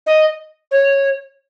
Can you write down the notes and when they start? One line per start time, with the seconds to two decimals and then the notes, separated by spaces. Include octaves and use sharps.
0.06 D#5
0.71 C#5